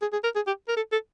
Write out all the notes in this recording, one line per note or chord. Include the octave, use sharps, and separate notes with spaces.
G#4
G#4
A#4
G#4
G4
A#4
A4
A4